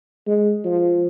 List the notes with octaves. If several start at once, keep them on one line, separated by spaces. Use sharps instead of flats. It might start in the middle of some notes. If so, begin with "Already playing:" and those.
G#3
F3